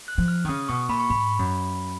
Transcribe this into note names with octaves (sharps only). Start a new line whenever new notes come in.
F#6
F3
F6
D#3
C#3 D#6
B2 C#6
A#2 B5
C#6
G#2 B5
F#2